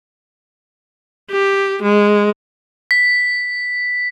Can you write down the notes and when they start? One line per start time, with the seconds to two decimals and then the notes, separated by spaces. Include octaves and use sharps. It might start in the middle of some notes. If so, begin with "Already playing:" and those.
1.31 G4
1.83 G#3
2.91 B6